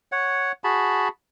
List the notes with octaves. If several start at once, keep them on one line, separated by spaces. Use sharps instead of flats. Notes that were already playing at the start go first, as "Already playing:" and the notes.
C#5 F#5
F#4 G#4 A5 B5